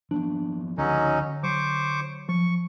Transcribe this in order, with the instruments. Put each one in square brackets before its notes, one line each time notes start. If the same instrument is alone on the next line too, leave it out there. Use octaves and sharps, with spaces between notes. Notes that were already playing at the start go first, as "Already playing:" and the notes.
[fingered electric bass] F3 A#3 B3 [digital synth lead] D4
[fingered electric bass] C#2 F3 [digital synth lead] D3 [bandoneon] F#3 C#4 D#4
[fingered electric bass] F#3 [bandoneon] C5 C#6 D6
[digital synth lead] F3 [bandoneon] C#6